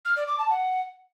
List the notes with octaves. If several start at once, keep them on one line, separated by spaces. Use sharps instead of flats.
F6
D5
D6
A5
F#5